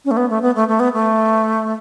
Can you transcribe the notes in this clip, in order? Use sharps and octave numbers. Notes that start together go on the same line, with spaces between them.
C#4
A3
B3
A3
B3
A3
A3
B3
A3